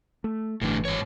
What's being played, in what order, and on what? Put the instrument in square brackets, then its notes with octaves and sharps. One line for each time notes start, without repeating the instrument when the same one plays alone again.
[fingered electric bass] A3
[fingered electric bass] G1 E3 [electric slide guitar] A2 D3
[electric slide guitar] G#2 C#5